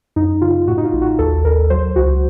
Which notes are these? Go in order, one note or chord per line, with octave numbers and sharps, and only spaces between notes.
F#2 D#4
C#3 F4
A2 F#4
D#4
F4
A1
F#4
D#2 A4
D#2 A#4
F#3 C5
C#2 F#4